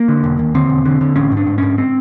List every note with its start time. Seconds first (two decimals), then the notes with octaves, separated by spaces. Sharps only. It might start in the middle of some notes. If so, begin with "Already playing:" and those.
Already playing: A#3
0.08 D3
0.24 E1
0.39 D#2
0.55 D3 C4
0.69 E1
0.85 D3
1.01 D3
1.16 A1 C#4
1.32 G#2
1.37 D4
1.47 G#2
1.58 G#2 C#4
1.78 C4